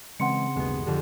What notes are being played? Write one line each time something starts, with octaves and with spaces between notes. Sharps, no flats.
C#3 E3 G#3 C4 F#5 C6 C#7
G1 D#2 B2 G#3 B3
F2 D3 G4 G#4